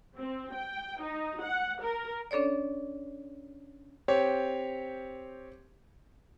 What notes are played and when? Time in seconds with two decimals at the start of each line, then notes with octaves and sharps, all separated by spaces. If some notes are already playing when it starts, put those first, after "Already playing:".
0.18 C4
0.54 G5
1.03 D#4
1.43 F#5
1.82 A#4
2.31 C#4 D4 A4 C#5 D5
4.08 C4 G4 C#5